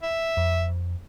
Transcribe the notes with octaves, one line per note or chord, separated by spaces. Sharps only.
E5
F2